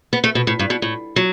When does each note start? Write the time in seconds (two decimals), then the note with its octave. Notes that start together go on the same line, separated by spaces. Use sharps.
0.13 B3
0.24 A3
0.35 B2
0.47 A2
0.59 G2
0.70 B2
0.82 A2
1.16 F#3